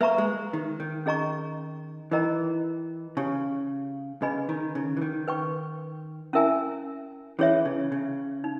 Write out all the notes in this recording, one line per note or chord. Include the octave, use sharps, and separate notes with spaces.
A#3 B4 E5 A#5 C#6
G#3
D#3
D#3
C#4 G#4 D#5 A#5 C#6
E3 D#4 A#4 D#5 G5 A#5
C#3 G4 C#5 G#5 C#6
C#3 G#4 B4 D#5 G#5 B5
D#3
C#3
E3
D#3
B4 G5 C#6
C#4 E4 A#4 E5 G#5
E3 C#4 G#4 C#5 E5
C#3
C#3
D#4